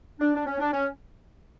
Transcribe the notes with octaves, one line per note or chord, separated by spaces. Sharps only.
D4
D4
C#4
D4
C#4